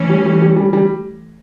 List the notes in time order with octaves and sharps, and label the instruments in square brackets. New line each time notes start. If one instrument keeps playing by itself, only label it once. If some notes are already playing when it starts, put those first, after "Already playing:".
Already playing: [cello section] E3 A3 C#4
[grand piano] G3
G3
G3
G3
G3